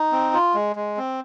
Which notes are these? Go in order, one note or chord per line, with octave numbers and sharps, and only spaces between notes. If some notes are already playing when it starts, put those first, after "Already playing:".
Already playing: D#4
C4
F4
G#3
G#3
C4